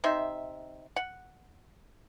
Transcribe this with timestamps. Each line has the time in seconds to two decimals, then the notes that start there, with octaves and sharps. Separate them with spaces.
0.04 C3 D#4 E5 C6
0.96 F#5